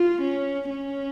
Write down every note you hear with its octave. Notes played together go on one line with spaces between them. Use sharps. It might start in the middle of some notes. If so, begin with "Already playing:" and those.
Already playing: F4
C#4
C#4